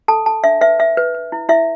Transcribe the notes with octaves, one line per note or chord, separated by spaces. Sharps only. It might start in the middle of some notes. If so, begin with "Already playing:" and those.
A4 A5
A4 A5
D4 E5
B4 E5
B4 E5
B4
B4
E4
E4 E5